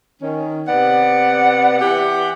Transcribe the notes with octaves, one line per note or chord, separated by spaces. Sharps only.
D#3 C#4
C3 B3 D5 F#5
E3 G4 F#5